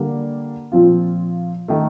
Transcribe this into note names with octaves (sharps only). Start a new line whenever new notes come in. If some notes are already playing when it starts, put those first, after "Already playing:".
Already playing: D3 G3 A#3 D4
A#2 F3 C4 F4
D#3 A3